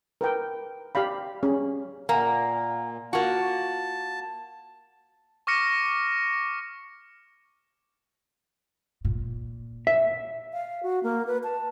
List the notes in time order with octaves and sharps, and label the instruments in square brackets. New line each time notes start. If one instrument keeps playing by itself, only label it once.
[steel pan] A#4 B4 G5
G4 D5 F5 B5
C#4 G#4
[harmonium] A#2 [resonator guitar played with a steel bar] A#3 [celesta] F#5 G#5 A#5
[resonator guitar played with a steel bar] A#3 F#4 [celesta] F4 [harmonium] A5
[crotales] C#6 D6 F6 A#6 C#7
[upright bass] A#2
[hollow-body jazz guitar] E5
[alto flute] F5
F#4
A#3
B4
A5